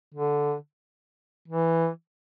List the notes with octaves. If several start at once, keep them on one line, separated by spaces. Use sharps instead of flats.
D3
E3